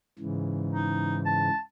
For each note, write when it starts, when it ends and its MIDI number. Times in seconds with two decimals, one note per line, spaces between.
0.19 1.49 44
0.19 1.49 49
0.19 1.49 52
0.72 1.18 63
1.25 1.59 81